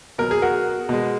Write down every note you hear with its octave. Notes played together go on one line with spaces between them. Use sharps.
B2 F#3 A#4
G#4
F#4 A#4
B2 G#3